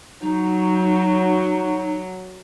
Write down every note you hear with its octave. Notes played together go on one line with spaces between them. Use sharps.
F#3 D#4